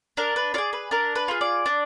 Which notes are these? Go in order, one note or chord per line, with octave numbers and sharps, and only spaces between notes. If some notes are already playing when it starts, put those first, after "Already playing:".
D4 A#4
B4
F4 G#4 D5
B4
D4 A#4
B4
F4 G#4
D5
D4